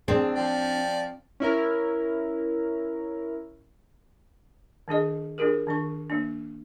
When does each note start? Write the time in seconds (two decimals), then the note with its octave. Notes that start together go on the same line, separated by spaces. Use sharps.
0.08 C4 D4 G#4
0.35 F3 D5 G5
1.40 C#4 E4 A#4
4.88 D#3 D4 G#4 D#5
5.38 D4 F4 G4 G#4 A#4
5.67 D#3 D4 C#6
6.10 A#3 D4